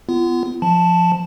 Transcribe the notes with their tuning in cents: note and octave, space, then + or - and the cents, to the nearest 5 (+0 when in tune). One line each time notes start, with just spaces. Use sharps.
B3 +20 F4 -35
F3 +0 A5 +0